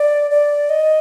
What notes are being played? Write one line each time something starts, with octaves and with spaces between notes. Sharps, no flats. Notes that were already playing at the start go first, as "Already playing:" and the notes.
Already playing: D5
D5
D#5